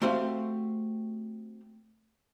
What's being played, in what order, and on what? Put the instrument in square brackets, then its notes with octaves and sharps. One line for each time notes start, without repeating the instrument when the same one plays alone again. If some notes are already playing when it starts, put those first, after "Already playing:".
[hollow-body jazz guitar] A3 C4 F#4 G4 C5 F5